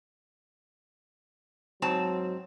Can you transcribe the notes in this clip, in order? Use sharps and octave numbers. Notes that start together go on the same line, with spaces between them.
G#2 F#3 C4 A5